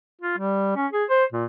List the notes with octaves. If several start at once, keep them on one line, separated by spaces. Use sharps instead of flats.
F4
G3
C#4
G#4
C5
A#2